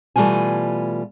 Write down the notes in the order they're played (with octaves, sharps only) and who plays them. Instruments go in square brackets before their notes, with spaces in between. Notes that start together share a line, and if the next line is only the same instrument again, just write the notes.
[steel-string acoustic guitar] B2 E3 G3 A3 F4 G#5